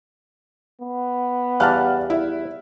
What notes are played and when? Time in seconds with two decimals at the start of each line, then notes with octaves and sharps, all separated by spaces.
0.81 B3
1.60 E2 G3 F5 A5 F6 F#6
2.10 E4